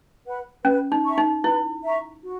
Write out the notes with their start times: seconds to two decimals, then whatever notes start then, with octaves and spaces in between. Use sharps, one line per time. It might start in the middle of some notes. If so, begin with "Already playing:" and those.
0.25 B4 F#5 B5
0.65 C#4 B4
0.92 D#4
1.04 E5 A#5 C#6
1.18 D#4
1.44 E4 B4
1.83 E5 A#5 C#6
2.24 F#4